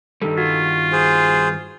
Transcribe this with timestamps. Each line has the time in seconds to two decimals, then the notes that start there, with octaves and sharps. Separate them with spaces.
0.22 G2 D#3 G3 D#4 A4
0.37 F4 F#4
0.92 G#4 C5